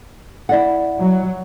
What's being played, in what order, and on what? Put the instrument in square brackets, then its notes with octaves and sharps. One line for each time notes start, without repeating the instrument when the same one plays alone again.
[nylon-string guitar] E4 D5 F#5
[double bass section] F#3